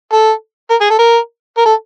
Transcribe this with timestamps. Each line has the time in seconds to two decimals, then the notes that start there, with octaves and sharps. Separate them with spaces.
0.13 A4
0.70 A#4
0.81 G#4
0.90 A4
0.99 A#4
1.58 A#4
1.65 A4